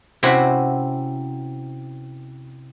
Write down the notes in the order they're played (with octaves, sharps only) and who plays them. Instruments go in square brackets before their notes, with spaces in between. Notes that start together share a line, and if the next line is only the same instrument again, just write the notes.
[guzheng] C3 C4 C#4 E4 F#4